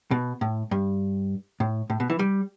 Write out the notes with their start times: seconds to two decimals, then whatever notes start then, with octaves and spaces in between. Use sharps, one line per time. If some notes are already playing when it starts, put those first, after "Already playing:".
0.11 B2
0.41 A2
0.71 G2
1.60 A2
1.90 A2
2.00 B2
2.10 E3
2.19 G3